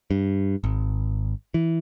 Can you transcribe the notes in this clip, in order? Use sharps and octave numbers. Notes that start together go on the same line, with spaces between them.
G2
G#1
E3